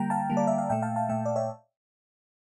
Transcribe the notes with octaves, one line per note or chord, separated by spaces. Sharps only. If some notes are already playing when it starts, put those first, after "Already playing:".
Already playing: D3 G3 A#3 G5 A#5
F5 A5
D3 G3 A#3
D5
E5
F5
A#2 A3 E5 G5
F5 A5
F5 A5
A#2 A3 E5 G5
D5
C#5 E5